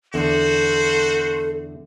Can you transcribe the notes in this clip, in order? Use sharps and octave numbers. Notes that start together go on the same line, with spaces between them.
E2 D3 F#4 A4 C5